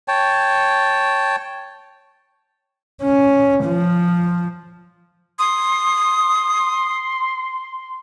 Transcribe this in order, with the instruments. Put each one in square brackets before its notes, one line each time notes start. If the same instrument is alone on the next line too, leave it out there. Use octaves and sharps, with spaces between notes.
[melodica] C#5 G5 A5
[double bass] C#4
F3
[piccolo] C6 [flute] D#6